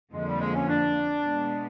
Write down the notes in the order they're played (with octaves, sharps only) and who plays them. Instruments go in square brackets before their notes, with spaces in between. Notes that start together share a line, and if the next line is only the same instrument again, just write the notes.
[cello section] F2 D3 F3 A#3 [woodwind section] G#3
[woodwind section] G3
G#3
C#4
D4
[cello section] B2 G#3 B3